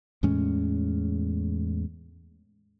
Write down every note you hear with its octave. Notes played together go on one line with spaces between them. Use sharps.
E2 A2 G#3 C#4